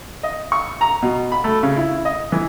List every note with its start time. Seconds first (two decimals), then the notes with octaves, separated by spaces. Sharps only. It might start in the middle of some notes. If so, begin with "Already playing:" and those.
0.23 D#5
0.52 C#6
0.81 A#5
1.02 B2
1.32 B5
1.44 A3
1.63 C#3
1.76 E4
2.05 D#5
2.32 E3